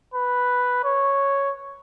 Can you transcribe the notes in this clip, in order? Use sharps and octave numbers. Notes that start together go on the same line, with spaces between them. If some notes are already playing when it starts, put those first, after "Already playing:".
B4
C#5